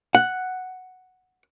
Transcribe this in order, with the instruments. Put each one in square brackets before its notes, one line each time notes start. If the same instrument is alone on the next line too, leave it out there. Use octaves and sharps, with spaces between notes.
[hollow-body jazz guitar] F#5